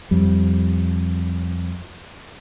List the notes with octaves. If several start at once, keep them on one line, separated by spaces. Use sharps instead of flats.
F2 G3